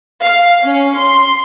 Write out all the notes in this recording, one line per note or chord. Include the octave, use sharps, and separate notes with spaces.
F5
C#4
C6